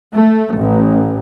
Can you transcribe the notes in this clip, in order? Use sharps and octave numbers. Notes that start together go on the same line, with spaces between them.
A3
A1